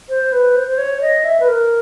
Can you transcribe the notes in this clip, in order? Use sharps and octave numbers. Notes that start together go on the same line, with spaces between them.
C5
B4
C5
C5
C#5
D#5
E5
B4
A#4